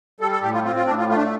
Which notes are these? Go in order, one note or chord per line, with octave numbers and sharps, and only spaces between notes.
G3 A4
A4
A2 G4
F4
C4 F4
F4
A2 D4
F4
A3 F4
D4